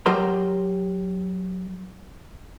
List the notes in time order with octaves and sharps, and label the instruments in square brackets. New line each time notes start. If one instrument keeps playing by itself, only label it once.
[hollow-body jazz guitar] F#3 G4 A#4 A#5 C6